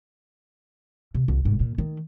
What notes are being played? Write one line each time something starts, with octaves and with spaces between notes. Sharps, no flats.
C3
C2 F4
F1 G#2
A#2
D#3 A3